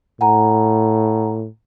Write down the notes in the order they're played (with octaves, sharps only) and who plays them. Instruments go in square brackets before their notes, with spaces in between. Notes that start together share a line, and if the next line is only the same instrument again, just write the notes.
[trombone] A2 [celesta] F#5 G#5 A#5